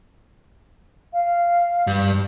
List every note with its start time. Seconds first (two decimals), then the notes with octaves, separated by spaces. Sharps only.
1.13 F5
1.87 G2